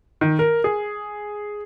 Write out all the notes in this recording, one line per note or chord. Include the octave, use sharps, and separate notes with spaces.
D#3
A#4
G#4